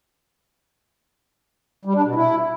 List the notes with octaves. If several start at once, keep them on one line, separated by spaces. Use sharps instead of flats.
G3
D4
B2
E4